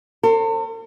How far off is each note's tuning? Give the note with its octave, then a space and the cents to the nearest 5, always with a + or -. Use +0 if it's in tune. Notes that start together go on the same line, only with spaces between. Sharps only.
A4 +45 C5 +30